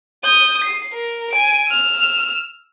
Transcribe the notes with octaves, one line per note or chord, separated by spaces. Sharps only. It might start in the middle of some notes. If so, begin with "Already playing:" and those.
D#6 G6
C7
A#4
G#5 D7
E6 F6